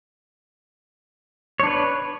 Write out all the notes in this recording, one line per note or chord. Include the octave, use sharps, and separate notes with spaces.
D4 B4 C#5